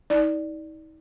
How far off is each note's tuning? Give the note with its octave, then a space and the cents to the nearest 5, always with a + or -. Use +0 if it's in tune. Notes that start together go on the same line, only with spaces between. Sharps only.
D#4 +35 D5 +0